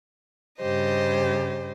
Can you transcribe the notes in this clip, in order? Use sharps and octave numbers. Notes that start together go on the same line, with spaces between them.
G2 C#3 G4 C5 D#5